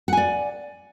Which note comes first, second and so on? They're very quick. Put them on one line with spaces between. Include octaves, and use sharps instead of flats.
F#5 G#5 D5